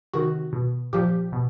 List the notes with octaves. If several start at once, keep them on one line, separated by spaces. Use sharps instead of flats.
C3 D#3 F#4
B2
A#2 F3 G4
B2